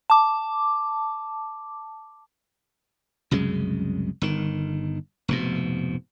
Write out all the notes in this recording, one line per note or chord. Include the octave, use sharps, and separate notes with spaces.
A5 D6
C2 F#2 C#3 G#3
G1 D#3
F1 G#2 B2